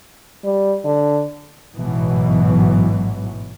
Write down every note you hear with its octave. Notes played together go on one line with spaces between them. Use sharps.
G3
D3
A1 G#2 B2 E3 F#3